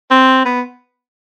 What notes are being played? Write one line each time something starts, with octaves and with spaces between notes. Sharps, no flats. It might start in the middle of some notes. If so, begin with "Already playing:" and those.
C4
B3